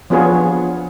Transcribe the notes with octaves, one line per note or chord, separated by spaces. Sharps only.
F3 B3 D4 F4 G#4 C#5